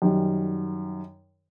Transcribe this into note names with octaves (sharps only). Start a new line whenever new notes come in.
F#2 D#3 G3